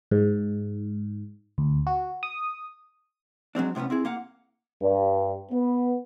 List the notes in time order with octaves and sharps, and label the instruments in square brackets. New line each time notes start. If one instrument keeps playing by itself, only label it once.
[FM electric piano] G#2
D2
F#4
D#6
[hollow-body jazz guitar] F#3 G#3 C4 D4
A2 C3 G3 B3 C#4
C4 E4 G#4
A#3 F5 F#5
[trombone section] G2
B3